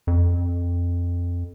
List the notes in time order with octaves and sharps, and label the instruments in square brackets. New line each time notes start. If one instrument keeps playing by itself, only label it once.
[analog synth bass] F2